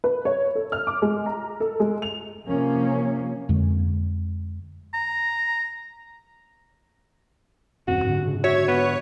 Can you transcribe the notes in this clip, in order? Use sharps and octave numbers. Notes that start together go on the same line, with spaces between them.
B4
C#5
A4
F6
D6
G#3
A#5
A4
G#3
F7
C3 F3 A#3 C#4
F2 D3 G#3
A#5
D#1 F#2 C4 F#4
G#2 D3
C#3
F#4 C#5 E5
B3